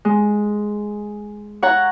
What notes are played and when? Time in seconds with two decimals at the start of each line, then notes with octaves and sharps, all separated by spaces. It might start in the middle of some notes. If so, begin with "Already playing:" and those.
0.05 G#3
1.63 C#5 F#5 A#5